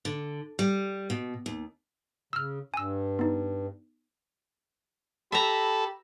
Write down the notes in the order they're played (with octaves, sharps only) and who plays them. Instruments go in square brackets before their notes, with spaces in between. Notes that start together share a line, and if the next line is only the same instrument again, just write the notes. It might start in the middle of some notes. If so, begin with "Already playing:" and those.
[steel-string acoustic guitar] D3
G3
B2
D#2
[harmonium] C#3 [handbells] E6 F6
[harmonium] G2 [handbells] G#5 E6
[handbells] B3 D#4
[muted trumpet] G4 [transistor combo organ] A4 [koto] E5 A#5 [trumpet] B5